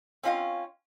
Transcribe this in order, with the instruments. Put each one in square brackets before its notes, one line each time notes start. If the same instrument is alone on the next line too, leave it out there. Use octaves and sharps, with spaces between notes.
[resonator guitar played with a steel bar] C4 C#4 F4 D#5 F5